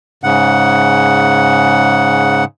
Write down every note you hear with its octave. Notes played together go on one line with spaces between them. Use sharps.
G#2 C#3 F#5